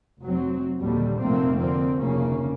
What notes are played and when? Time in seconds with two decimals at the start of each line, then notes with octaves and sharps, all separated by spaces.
0.21 F1 F#3 C4
0.80 A#1 D#2 A#2 D3 G3
1.21 F1 A#1 F2 A3 A#3 C4
1.56 F2 D3 F3 A#3 C4
1.98 F1 D2 C#3 A#3 C#4